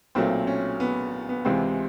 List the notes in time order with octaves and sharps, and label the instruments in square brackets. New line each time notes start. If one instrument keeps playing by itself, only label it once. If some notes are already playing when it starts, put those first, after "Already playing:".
[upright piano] B1 A#2 F#3 A3 C4
C#4
B3
B3
C#2 C3 E3 G#3 C4